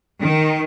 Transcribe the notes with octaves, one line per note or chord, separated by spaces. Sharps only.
D#3